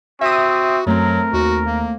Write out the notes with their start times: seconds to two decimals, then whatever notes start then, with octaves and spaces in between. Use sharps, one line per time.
0.21 C4 F#4 E5 D#6
0.87 F#2 F#3 A3 C4 A#4
1.33 D#2 F#4
1.66 A#3